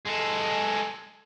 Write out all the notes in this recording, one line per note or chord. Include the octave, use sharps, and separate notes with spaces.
G#3 A4